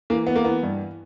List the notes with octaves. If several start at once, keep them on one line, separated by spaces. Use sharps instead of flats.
E3 A#3
E3 B3
A#3
E3 B3
G2